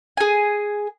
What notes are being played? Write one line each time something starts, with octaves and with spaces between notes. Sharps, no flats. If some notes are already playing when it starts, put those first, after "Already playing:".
G#4 G#5